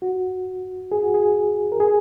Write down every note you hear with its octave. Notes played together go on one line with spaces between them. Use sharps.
F#4
G#4
F#4
G#4
A#4
G#4